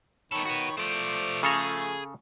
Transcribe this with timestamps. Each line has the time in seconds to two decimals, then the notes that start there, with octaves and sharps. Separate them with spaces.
0.32 D#3 B3 A4 C#5 B5
0.46 F#4 B4
0.78 F3 A3 C5 D5
1.43 C#3 G#4 A4 A#5